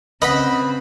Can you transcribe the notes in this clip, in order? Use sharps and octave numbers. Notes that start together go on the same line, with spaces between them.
C#3 C4 B4 D#5 F#5 B5